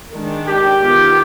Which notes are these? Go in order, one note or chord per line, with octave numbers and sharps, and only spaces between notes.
D#3 G#3 D4
G4
D#3 B3 F4